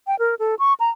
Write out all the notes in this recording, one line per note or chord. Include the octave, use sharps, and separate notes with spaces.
G5
A#4
A4
C#6
A#5